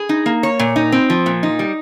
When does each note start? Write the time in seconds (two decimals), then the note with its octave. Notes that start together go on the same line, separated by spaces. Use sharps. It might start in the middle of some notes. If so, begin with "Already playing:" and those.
Already playing: G#4
0.09 D#4
0.26 A#3
0.43 C#5
0.59 A#2
0.76 D#4
0.92 C4
1.10 F3
1.26 A#2
1.43 D#4
1.59 G3